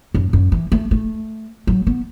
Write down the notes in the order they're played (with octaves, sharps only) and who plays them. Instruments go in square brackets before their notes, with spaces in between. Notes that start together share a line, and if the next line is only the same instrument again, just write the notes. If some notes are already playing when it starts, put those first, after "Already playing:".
[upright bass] F#2
F#2
E3
A3
A3
F#3
B3